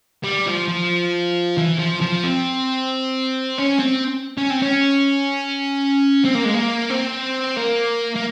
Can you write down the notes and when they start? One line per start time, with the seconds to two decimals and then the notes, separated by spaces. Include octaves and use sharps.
0.24 G3
0.46 F3
0.69 F3
1.58 E3
1.79 F3
2.02 F3
2.24 C4
3.58 C#4
3.79 C4
4.38 C#4
4.50 C4
4.62 C#4
6.25 C4
6.35 A#3
6.45 G#3
6.54 A#3
6.90 C4
7.57 A#3
8.15 A#3